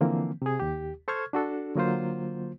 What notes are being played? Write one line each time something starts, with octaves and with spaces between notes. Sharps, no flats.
D3 E3 F3 A#3 C4
C3 G#4
D#2 G4
A4 C5 C#6 F6 G#6
D4 F#4 A4
D3 F#3 A#3 F4 C5